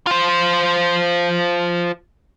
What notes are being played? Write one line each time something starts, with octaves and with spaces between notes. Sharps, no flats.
F4 C5